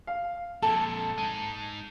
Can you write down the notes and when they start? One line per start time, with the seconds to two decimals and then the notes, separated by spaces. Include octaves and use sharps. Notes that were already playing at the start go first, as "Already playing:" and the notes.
0.07 F5
0.63 F2 A#2 A4 A5
1.18 G#3 D#4 D#7